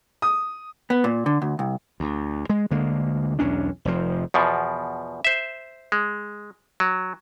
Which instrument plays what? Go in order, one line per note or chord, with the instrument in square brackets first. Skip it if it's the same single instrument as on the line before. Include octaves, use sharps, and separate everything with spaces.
[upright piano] D#6
[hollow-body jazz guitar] B3
A#2
D3
D2
C2
[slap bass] D2
G#3
D2 D3 G#3 A#3
B1 E2 C#4 D4
F1 F2 F3
[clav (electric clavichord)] E2 B2 F3
C5 E5
G#3
F#3